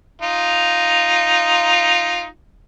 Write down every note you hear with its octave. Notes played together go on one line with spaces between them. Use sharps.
D#4 F4